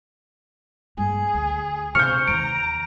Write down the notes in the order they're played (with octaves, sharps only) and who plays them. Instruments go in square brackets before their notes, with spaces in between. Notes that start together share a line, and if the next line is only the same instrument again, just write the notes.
[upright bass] G2 A#3 [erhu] G#4
[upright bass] D2
[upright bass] C3 [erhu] C5 [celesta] C#6 C#7 [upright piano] F6 G6
[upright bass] D#2 E3 [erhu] A#5 [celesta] D7